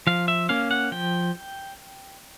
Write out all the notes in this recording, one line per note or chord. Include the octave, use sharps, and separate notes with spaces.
F3 F5
E5
A#3 C#4 F5
F#5
F3 G5